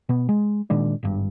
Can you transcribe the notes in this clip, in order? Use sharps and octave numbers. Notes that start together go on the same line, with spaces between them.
B2 B3
G#3
A#2 D#3 G#3 D4
G#1 G2